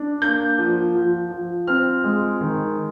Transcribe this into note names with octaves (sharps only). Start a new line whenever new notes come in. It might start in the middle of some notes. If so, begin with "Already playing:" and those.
Already playing: D4
A#3 G6
F3
F3
F3
C4 F6
G#3
D#3